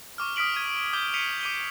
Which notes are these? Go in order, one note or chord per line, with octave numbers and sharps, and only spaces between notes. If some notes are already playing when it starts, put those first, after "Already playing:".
C#6 D6 F6
D#6 F6 B6 D7 F#7
G#6 B6 D#7
D6 G6 G7
D#6 B6 C#7 D#7 F7 G7
D6 D#7 G7